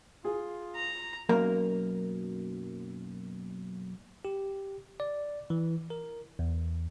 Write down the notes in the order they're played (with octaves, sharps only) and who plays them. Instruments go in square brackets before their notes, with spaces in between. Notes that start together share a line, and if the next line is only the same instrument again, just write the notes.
[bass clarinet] F4 [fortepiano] G#4
[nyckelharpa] A#5
[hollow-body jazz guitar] B1 F#2 A#3 A#4
[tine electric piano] G4
D5
E3
A#4
E2